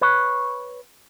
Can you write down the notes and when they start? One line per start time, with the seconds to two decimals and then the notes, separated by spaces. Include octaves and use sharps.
0.01 B4 C#5